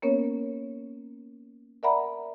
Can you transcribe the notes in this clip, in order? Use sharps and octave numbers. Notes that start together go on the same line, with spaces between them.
A#3 B3 C#4 A#4 C#5
A#4 D5 E5 F#5 A#5 B5